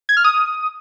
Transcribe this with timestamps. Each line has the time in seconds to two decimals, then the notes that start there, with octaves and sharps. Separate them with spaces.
0.09 G#6
0.17 F6
0.24 D#6